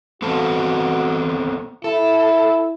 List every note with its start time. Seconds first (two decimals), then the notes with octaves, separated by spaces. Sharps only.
0.22 B3 C4 F#4 A4
1.84 E4 A4